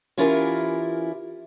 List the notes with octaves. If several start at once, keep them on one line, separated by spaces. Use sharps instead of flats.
E3 C#4 E4 F4 G4 A#4